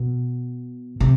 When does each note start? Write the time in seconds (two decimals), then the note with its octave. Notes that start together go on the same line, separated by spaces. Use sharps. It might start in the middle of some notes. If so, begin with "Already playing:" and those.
Already playing: B2
1.00 C3